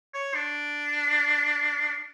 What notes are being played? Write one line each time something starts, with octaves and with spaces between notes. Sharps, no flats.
C#5
D4